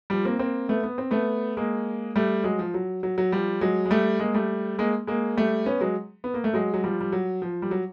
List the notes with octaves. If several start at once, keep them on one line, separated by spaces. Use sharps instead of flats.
F3 G3
A#3 C4
A#3 C4
A3 B3
B3
C4
A3 B3
G#3 A#3
G3 A3
F#3 G#3
F3
F#3
F#3
F#3
F3 G3
F#3 G#3
G#3
G3 A3
G#3 A#3
G3 A3
G#3 A#3
G#3 A#3
G3 A3
B3 C#4
F#3 G#3
B3
A#3
A3
F#3 G#3
F#3
F3 G3
G3
F#3
F3
G3
F#3